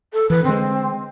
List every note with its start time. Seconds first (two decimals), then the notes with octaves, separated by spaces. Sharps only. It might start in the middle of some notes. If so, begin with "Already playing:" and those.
0.13 A4
0.30 E3 B4
0.44 D3 G#3 C4